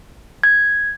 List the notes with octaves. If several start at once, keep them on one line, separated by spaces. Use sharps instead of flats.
G#6